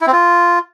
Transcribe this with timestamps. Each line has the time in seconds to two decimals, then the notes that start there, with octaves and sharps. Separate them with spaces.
0.01 E4
0.07 C4
0.13 F4